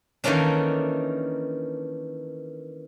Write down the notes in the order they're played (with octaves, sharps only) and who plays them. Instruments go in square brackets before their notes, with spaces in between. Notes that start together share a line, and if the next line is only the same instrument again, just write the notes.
[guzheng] D#3 E3 A3 A#3 C#4 D4